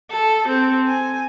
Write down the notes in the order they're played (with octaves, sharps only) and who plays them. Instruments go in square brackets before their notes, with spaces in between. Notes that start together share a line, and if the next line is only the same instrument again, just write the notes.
[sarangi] A4
C4
G#5